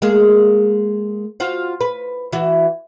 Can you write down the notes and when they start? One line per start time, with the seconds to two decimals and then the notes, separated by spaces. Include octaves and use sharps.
0.02 G#3 A#3 G#4
1.40 F4 F#4 C5
1.81 B4
2.33 E3 F#4